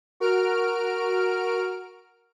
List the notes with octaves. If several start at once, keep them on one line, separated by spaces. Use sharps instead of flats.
F#4 A#4 F6 D7